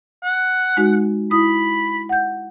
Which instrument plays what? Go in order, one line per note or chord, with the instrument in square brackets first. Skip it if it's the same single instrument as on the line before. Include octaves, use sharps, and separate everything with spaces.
[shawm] F#5
[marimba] G#3 D#4 F#4
[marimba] E4 D#6 [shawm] B5
[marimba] F#5 G6